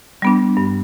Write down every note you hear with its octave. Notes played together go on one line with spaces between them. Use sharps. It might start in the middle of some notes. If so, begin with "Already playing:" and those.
G3 B3 D4
G2